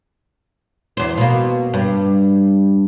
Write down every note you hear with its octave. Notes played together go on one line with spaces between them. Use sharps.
E2 C5
B2 A#3
G2